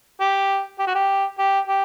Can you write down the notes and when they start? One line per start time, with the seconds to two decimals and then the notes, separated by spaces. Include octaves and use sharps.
0.21 G4
0.79 G4
0.87 F#4
0.95 G4
1.39 G4
1.67 G4